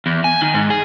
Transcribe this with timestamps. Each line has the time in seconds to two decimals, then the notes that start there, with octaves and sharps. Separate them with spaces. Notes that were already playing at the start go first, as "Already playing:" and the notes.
0.06 E2
0.24 G#5
0.41 D#3
0.54 G#2
0.70 G#4